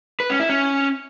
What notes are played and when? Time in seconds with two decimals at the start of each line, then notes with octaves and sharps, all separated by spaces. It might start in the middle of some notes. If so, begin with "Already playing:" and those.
0.20 B4
0.30 C#4
0.40 E4
0.50 C#4